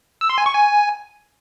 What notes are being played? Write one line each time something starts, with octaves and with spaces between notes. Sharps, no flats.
E6
C6
G#5
C#6
G#5